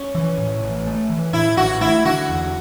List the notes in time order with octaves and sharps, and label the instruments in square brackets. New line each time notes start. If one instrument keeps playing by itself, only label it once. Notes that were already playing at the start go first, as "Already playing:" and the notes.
Already playing: [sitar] C#4
[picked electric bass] E3
A2
A1
A3
E3
[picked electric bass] A2 [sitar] E4
[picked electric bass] A1 [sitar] F#4
[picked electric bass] A3 [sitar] E4
[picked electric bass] D3 [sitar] F#4
[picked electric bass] E2